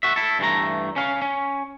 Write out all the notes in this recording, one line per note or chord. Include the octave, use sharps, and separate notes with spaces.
F#4 E5
E4 A4
G2 E3 A3 A#5
C#4 F5
C#4